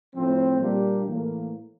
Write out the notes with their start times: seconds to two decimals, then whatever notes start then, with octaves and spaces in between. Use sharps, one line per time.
0.14 A2 F3 C4
0.60 A#2 G3 A#3 D4 G4
1.04 A2 E3 A#3